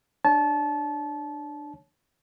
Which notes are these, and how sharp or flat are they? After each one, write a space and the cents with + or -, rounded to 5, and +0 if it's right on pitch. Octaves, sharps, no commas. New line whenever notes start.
D4 +20 C#5 +0 A5 -25